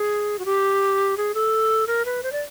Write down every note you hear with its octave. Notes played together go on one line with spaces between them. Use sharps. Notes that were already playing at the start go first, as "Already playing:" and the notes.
Already playing: G#4
F#4
G4
G#4
A4
A#4
B4
C5
D5